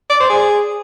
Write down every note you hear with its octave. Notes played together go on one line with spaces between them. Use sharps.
D5
C5
G#4